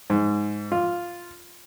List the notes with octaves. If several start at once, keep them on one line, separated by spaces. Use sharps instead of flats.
G#2
F4